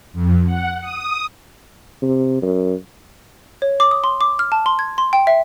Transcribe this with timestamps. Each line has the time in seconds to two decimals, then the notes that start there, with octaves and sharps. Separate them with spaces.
0.13 F2
0.45 F#5
0.81 D#6
2.02 C3
2.42 F#2
3.62 C#5
3.80 D6
3.91 D#6
4.04 C6
4.21 D6
4.39 F6
4.52 A5
4.66 C6
4.79 G#6
4.98 C6
5.13 G5
5.27 E5